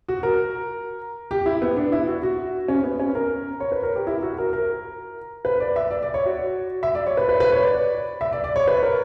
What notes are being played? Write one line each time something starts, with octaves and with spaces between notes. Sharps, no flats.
F#4
A#4
G4
E4
B3
D4
E4
F#4
F#4
C#4
B3
C#4
A#4
C#5
B4
A#4
G4
E4
F#4
A#4
A#4
B4
D5
E5
D5
D5
C#5
F#4
E5
D5
C#5
B4
B4
B4
C#5
D5
E5
D5
D5
C#5
B4
A#4